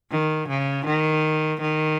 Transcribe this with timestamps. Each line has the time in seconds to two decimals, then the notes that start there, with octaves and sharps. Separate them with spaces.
0.11 D#3
0.49 C#3
0.86 D#3
1.61 D#3